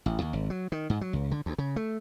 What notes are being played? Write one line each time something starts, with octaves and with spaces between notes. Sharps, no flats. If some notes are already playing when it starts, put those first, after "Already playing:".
A1
D#2
G#1
F#3
D#3
G#2
F#3
C#2
D3
D2
C#3
A3